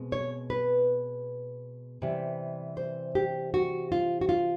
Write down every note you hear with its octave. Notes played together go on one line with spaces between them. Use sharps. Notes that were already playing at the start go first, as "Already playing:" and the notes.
Already playing: B2 G#3 C4
C#5
B4
C3 E3 G3
C5
G4
F#4
F4
F#4
F4